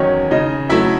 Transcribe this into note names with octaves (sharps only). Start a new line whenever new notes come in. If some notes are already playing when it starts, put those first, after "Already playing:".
Already playing: E2 D#3 F#3 C#4 D#4 C#5
C#3 D#4 D#5
F#3 A3 E4 E5